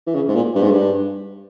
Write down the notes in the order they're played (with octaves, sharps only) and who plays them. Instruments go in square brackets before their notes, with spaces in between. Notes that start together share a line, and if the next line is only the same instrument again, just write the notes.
[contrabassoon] E3
C#3
G#2
A#2
G2
G#2
G2